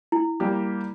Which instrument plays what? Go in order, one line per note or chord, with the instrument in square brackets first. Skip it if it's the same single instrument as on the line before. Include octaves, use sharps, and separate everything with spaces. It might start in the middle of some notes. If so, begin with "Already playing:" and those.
[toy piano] E4
[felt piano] G3 A#3 G4